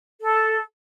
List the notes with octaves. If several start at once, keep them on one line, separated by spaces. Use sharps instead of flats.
A4